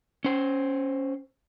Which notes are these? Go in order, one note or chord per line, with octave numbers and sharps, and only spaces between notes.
C#4 C5